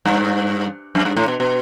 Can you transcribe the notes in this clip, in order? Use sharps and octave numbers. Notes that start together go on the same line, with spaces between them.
G2
F#2
G2
A2
B2
B2